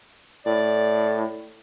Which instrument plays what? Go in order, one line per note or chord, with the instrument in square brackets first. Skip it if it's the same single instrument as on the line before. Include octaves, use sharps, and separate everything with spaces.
[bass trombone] A2 [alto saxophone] D5